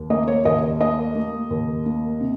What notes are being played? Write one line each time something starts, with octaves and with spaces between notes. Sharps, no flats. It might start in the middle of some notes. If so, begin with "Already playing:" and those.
Already playing: D#2
A#3 D#5
C#5
D#2 D#5
A#3 D#5
A#3
D#2
A#3
C3